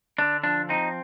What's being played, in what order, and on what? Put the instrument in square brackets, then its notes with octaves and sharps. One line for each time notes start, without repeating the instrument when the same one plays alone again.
[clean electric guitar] D3 D4
F3 D4
C4 D#4